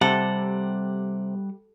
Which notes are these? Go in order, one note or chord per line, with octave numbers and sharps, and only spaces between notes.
C3 G3 A4 F#5